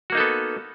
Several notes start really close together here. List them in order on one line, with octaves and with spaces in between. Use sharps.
F#4 A#3 D#4 A4 B3